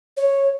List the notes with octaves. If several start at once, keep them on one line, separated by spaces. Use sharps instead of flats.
C#5